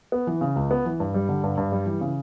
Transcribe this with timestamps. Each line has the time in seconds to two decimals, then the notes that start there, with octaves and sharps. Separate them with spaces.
0.12 B3
0.27 E3
0.41 C#3
0.56 C#2
0.71 B3
0.86 E3
1.00 G2
1.14 G3
1.29 D3
1.44 G2
1.57 G2
1.72 G3
1.86 E3
2.01 C#3